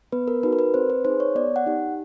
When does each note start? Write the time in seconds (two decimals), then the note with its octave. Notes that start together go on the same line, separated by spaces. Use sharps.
0.12 B3 B4
0.28 A#4
0.43 D#4 F#4 B4
0.53 A#4
0.59 B4
0.74 C4 C5
0.90 B4
1.05 D#4 G#4 C5
1.20 C#5
1.35 B3 D5
1.56 F#5
1.66 D#4 G4